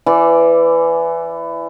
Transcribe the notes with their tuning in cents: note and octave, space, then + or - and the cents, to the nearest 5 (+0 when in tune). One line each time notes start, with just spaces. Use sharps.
E3 +20 D5 +0